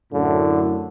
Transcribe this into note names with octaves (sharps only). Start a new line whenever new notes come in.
F#2 A2 D3